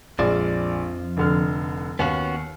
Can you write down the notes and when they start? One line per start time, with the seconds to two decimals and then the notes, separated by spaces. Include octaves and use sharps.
0.19 A#1 F2 F3 G#3 D5
1.17 F1 D3 F6
1.99 D#2 B3 C#4 F#4